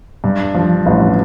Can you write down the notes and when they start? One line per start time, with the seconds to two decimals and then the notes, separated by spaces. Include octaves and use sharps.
0.24 G2
0.54 F3
0.86 A1